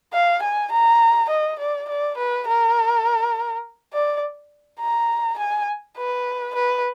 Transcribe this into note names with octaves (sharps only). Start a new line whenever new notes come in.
F5
G#5
A#5
D#5
D5
D5
B4
A#4
D5
A#5
G#5
B4
B4